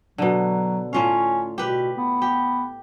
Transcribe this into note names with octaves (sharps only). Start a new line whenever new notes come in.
B2 D3 F#3
A2 C#4 F4 F5
B2 G4 B4
B3
G4